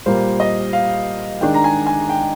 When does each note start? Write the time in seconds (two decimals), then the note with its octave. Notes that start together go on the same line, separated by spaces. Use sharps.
0.06 A#2 G3 A#3 C5
0.40 D#5
0.73 F5
1.41 D#3 G#3 D4 G5
1.54 A#5
1.64 G#5
1.87 G#5
2.10 G5